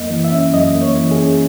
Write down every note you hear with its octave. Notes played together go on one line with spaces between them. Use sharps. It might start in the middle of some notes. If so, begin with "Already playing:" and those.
Already playing: F#2 A#3 D#5
E3
E5
C#4
F#2 D#5
A#3
C#5
E3
G#4
C#4